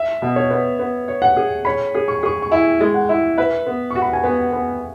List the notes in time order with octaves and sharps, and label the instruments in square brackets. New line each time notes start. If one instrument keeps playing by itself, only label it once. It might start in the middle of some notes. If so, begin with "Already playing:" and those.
Already playing: [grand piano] E5
[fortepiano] B2
[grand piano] C#5
[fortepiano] B3
B3
C#5
[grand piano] F#5
[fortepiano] G#4
[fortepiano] C#5 [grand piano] B5
[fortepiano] G#4
[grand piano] C#6
[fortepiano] G#4 [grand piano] C#6
[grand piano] C#6
[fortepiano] E4 [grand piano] G#5
[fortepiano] G#3
[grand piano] F#5
[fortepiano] E4
[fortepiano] B4 [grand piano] E5
[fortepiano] B3
[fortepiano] F#4 [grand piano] C#6
[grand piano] B5
G#5
[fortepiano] B3 [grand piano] F#5
[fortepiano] B3